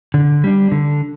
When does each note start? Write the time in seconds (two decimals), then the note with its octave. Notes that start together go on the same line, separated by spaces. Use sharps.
0.14 D3
0.44 G3 D4
0.72 D3